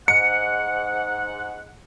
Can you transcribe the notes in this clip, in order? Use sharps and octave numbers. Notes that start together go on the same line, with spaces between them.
G#2 F#5 C#7